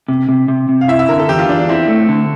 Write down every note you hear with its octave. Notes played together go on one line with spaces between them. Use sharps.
C3
C3
C3
C3
F5
E4 E5
E5
D3 A#4
A4
E2 G4
F4
E2 D4
D4
C4 E4
A3
D3